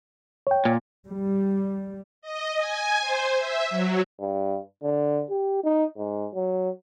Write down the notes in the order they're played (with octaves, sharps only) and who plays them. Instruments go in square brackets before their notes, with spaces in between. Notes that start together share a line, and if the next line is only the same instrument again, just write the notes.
[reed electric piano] C#5 G5
[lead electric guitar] A#2
[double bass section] G3
[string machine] D#5
G#5
C5
E5
F#3
[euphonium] G2
D3
G4
D#4
G#2
F#3